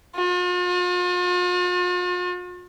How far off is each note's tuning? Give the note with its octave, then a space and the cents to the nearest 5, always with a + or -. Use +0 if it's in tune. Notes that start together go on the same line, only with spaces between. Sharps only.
F4 +45